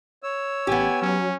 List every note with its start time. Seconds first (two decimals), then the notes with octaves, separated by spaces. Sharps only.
0.23 C#5 E6
0.67 A1 B3 G4 G#5
1.01 F#3 C#4